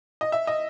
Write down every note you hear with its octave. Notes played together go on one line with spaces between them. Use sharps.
D#5
E5
D#5